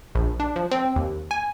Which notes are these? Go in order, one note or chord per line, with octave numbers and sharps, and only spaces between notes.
A#1
D4
F3
C4
D#2
G#5